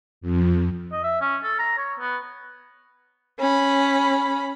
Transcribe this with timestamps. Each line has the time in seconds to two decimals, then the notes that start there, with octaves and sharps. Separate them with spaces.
0.21 F2
0.92 D#5
1.03 E5
1.21 C#4
1.43 A4
1.59 A#5
1.78 C#5
1.99 B3
3.39 C#4 B5